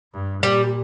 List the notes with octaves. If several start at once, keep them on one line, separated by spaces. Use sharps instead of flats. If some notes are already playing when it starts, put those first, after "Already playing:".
G2
A#2 G3